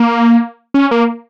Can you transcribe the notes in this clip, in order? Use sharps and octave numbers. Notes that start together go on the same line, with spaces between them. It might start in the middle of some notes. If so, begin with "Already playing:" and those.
Already playing: A#3
C#4
A#3